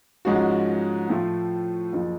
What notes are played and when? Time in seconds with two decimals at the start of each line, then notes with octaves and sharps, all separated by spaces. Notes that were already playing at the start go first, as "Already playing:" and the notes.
0.25 G#2 F3 G#3 C#4 F#4
1.09 A2 F3 A3 F4
1.93 F#1 F3